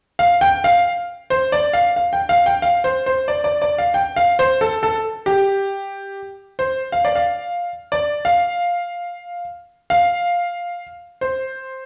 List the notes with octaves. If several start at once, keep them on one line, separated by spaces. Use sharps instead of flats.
F5
G5
F5
C5
D5
F5
F5
G5
F5
G5
F5
C5
C5
D5
D5
D5
F5
G5
F5
C5
A4
A4
G4
C5
F5
D5
F5
D5
F5
F5
C5